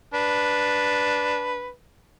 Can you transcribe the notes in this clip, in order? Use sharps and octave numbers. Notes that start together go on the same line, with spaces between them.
D4 B4